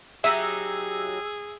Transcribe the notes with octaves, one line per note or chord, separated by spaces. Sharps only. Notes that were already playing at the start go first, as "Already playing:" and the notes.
F#3 D#4 G4 G#4 E5 E6